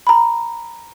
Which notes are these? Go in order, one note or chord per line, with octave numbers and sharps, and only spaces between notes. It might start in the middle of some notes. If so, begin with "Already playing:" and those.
A#5 B5